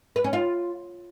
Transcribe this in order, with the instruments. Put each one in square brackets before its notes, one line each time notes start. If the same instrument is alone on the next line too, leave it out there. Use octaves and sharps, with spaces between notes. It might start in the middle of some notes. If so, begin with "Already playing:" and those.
[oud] B4
C#4
F4